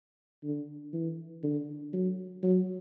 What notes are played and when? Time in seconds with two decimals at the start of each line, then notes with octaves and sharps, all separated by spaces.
0.44 D3
0.93 E3
1.43 D3
1.93 F#3
2.43 F#3